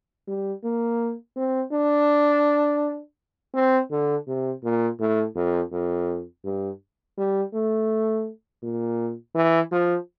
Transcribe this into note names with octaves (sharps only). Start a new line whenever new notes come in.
G3
A#3
C4
D4
C4
D3
C3
A#2
A2
F2
F2
G2
G3
A3
A#2
E3
F3